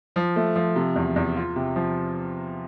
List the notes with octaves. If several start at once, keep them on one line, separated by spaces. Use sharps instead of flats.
F3
A3
F3
C3
E2
E2
F4
C3
F3